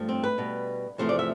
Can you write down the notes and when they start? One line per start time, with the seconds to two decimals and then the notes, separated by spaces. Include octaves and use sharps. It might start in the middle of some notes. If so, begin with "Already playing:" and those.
Already playing: G2 F3 A3
0.09 C4
0.24 B4
0.38 B2 G3
0.98 E2 C3 F3 A3 C5
1.09 D5
1.19 E5